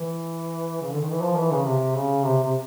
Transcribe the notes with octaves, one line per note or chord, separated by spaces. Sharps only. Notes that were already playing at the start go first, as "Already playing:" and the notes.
Already playing: E3
C#3
D3
D#3
E3
F3
E3
C#3
C3
C#3
C3
C3